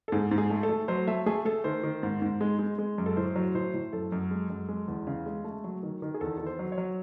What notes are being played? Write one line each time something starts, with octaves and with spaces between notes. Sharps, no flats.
A4
G#2 G#4
G#2
G#4
A3
A4
A3
F#3 C5
A3 E5
A3 G#4
A3 A4
D#3 C5
D#3
G#2
G#2
G#3
G#3
G#3
F#2
A4
A2 C5
F#3
A2 C5
A2
F#2 A4
F#2
G#3
F#2
G#3
E2
C#3
G#3
A3
F#3
D#3
D#3
G#4
E2 A4
D#3 A4
C5
F#3
C#5
F#3